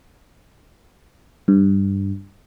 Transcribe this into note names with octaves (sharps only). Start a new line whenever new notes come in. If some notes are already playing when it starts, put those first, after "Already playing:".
G2